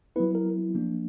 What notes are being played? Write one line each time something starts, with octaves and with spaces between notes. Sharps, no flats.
F#3 B3 E4 B4
A#4
F3 A#3 D4